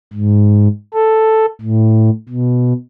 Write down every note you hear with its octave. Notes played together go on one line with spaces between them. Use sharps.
G#2
A4
A2
B2